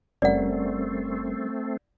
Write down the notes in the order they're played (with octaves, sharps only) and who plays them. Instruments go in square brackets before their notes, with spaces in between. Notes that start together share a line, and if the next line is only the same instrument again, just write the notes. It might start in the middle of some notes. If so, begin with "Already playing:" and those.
[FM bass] F#1 [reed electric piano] G3 C#4 A#4 [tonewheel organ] A3 C4 [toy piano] D5 F#5